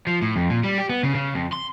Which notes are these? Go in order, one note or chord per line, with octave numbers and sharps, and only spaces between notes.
F3
A2
F2
A#2
G3
G4
B3
C#3
C#3
F2
C6